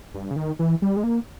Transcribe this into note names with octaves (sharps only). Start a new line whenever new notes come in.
G2
C#3
D#3
E3
G3
G#3
A#3